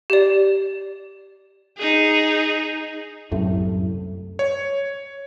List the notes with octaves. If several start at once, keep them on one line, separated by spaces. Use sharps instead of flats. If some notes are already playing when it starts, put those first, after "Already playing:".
G4 D5
D#4 G#4
C2 F#2 A2 A3
C#5